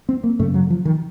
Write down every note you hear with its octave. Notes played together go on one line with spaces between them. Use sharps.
C4
A#3
F#2 C#3 A3
F#3
F3
D#3